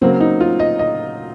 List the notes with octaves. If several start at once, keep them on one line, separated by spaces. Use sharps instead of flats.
C#3 F#3 A#3 C4
D#4
F4
D#5
D#5